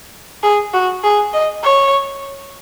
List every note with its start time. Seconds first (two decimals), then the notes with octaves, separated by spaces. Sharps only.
0.44 G#4
0.74 F#4
1.04 G#4
1.34 D#5
1.64 C#5